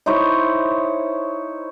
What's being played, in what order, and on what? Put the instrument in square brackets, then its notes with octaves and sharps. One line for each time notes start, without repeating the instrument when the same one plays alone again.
[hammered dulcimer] D#4 E4 C5 C#5